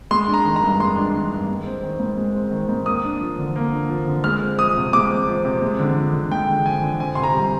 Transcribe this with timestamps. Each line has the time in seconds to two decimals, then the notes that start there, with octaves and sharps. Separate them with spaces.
0.11 G#3 C6
0.28 D4
0.34 A#5
0.45 D#3
0.56 A#5
0.63 G2
0.80 G#3 C6
0.96 D4
1.14 D#3
1.31 G2
1.48 G#3
1.66 C4
1.83 D#3
2.00 G#2
2.17 G#3
2.35 C4
2.51 D#3
2.69 G#2
2.86 A#3 D#6
3.04 D4
3.21 F3
3.38 D3
3.56 A#3
3.72 D4
3.90 F3
4.07 D3
4.24 G#3 F6
4.42 C4
4.58 F3 D#6
4.76 C3
4.93 G#3 D6
5.10 C4
5.27 F3
5.45 C3
5.62 G#3
5.79 D3
5.97 F3
6.13 D3
6.31 G#3 G5
6.49 D3
6.66 F3 G#5
6.83 D3
7.00 C4 G#5
7.15 C3 C6
7.23 A#5
7.34 G3